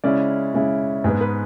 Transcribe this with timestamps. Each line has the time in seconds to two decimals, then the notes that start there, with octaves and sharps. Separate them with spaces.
0.04 C#3 G#3 C#4 E4 D5
0.54 C#3 G#3 C#4 E4
1.04 G#2 G#3 B3
1.21 B4